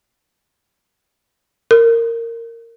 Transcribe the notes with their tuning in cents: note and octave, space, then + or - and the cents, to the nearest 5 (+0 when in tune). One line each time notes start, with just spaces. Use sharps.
A#4 -15